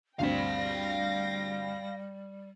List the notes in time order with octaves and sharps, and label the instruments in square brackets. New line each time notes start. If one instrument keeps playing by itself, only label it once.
[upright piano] D2 G2 C4 [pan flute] G3 [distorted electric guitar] F5 B5 [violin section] G5 A#6